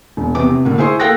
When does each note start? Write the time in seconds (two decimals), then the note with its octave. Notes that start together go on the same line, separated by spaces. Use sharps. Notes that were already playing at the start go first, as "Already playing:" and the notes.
0.17 E1
0.35 E2 C3 B3 D6
0.50 C3
0.65 A2 D3 A#3
0.78 E4 G#4 C5 C6 C#6
1.00 A#3 A4 F5 G5 F#6 A#6